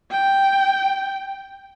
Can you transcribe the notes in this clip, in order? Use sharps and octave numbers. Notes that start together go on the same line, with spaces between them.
G5